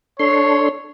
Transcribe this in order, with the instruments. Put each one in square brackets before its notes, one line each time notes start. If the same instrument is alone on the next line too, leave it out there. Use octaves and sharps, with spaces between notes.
[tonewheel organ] D4 A4 C6 [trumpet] C#5